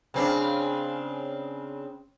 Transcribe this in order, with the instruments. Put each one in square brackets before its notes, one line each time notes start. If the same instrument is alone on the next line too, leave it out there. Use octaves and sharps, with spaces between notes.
[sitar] C#3 C4 D4